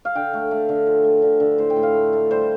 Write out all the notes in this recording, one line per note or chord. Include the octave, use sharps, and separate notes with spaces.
F5
D3 G5
A3
A3
D3
F3
A3
D3
D3
A2 C5
G5
A2
F5
A3
A3
G3 C5